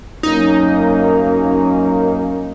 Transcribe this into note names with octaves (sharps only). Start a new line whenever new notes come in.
F#2 A#3 C#4 D#4